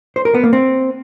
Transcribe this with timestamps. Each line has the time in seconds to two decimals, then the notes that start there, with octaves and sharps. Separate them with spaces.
0.16 C5
0.25 A#4
0.34 B3
0.44 A#3
0.53 C4